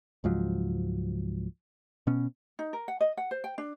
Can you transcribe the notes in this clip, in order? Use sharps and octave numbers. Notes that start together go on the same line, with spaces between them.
C#2 G#2 F3 F#3
B2 B3 C#4
D#4
A#4
F#5
D#5
F#5
C5
G5
D4